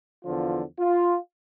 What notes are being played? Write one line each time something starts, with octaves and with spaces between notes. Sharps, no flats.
E2 D3 F3 F4
F4